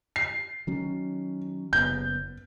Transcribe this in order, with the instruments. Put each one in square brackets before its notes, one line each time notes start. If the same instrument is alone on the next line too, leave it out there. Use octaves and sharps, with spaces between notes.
[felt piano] C7
[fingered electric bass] D#3 F#3 C#4
[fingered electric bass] F#1 B3 [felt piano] G6